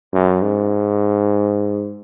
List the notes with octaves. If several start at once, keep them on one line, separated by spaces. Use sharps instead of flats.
F#2
G#2